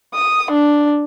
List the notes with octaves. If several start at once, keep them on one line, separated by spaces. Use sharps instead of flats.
D#6
D4